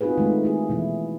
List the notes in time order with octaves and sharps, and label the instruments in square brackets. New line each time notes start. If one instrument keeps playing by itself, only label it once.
[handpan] C4 D#4 F4 F#4 G#4 B4
D#3 G#3 A3
A3 E4 G#4
B2 E3 E4